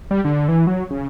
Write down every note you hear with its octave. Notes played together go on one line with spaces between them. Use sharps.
G3
D3
E3
F#3
C#3